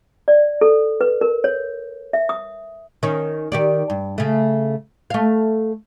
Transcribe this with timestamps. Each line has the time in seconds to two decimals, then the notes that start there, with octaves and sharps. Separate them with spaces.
0.28 D5
0.61 A4
1.01 B4
1.21 A#4
1.44 C#5
2.13 E5
2.29 D#6
3.03 D#3 C#4
3.52 D#3 G4 D5
3.90 G2
4.18 C#3 A3
5.10 A3 F5